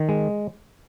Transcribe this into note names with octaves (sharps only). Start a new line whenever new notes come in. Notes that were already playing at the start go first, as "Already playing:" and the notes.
Already playing: D#3
G#3